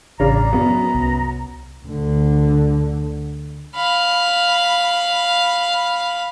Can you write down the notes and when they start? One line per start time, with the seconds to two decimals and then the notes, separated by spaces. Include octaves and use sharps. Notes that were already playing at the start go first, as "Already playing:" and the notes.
0.20 A1 C#3 D4 A#5
0.53 F#2 F#3 B3
0.94 C2
1.86 D2 D3
3.75 F5 B5